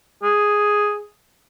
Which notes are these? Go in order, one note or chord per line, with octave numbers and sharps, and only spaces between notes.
G#4